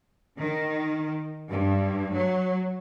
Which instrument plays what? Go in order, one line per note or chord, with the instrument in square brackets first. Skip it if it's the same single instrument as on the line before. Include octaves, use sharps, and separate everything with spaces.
[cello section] D#3
G2
F#3